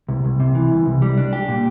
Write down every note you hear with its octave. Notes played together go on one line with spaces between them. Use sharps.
C2
C2
C3
E3
C2
C2
G3
D4
G4
A#2